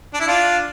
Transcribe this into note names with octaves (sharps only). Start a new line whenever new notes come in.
D4
E4
D4 F4